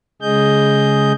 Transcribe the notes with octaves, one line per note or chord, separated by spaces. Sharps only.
C#3 G#3 G#4 D#5 G6